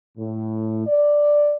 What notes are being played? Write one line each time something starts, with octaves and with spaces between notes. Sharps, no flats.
A2
D5